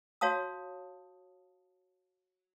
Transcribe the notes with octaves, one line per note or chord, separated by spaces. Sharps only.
F#4 C#5 F5 A5 D#6